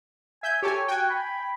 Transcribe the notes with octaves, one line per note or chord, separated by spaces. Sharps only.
E5 G#5 G6
G4 A4 C#5 G#5
F#4 G5 G#5
B5